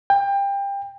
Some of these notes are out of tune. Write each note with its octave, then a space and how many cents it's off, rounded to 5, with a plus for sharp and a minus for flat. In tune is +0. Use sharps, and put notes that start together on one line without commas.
G5 +25